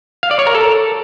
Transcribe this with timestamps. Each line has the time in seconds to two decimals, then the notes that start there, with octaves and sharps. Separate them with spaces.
0.23 F5
0.31 D5
0.39 C#5
0.47 A#4
0.55 A4